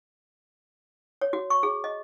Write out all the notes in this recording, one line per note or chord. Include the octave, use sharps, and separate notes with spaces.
C#5
F#4
C#6
G#4
D#5